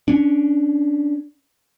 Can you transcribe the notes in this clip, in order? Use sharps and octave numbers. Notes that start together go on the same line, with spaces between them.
C#4 D4